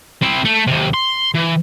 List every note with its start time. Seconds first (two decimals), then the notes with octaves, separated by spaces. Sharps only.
0.22 C4 E4
0.45 A3
0.67 D#2 C3
0.94 C6
1.34 E3